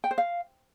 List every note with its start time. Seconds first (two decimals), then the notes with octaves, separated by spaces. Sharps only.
0.04 G5
0.11 C5
0.18 F5